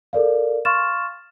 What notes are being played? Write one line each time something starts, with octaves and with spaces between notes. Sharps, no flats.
A4 A#4 D5 F5
F5 C6 C#6 F6 A6 E7